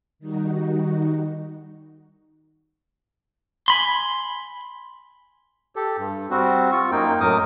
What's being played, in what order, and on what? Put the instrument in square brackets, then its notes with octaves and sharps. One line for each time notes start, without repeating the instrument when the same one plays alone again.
[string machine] D#3 G3 D#4 F#4
[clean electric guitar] G#5 B5 C6
[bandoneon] G4 A4
G2
G3 C4 F#4
F4 C#6
F#2 A#3 D#4 G5
F#2 A2 F#3 A#4 D6 D#6